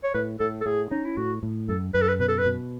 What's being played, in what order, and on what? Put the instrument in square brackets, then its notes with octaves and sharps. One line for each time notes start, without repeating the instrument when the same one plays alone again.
[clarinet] C#5
[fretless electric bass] A2 [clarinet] B4
[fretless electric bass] A2 [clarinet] A4
[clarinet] A4
[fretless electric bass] A2 [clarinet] G#4
[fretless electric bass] C#4 [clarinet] D#4
[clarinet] E4
[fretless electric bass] A2 [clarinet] F#4
[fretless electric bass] A2
[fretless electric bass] F#2 [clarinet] A4
[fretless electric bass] F#2 [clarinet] B4
[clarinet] A4
B4
[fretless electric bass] B2 [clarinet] B4
[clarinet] A4
B4
[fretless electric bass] B2